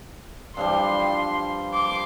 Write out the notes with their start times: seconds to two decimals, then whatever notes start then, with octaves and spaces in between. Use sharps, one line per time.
0.57 G2 F3 G3 C6
1.73 C6 D6